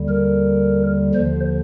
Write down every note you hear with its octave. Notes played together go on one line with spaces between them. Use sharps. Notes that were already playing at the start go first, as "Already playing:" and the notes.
Already playing: D#2 D3 G3
A#4
D#2 D3 F3 C5